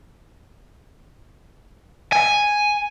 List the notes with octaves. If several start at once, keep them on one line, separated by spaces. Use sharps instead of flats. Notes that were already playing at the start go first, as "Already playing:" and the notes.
G#5